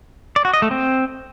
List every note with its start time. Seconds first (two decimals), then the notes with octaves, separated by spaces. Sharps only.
0.36 D5
0.45 F#4
0.53 D#5
0.62 A3
0.71 C4